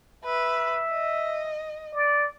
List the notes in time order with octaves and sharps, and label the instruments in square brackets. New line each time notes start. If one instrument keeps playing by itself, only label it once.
[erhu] B4 [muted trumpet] E5
[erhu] D#5
[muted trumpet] D5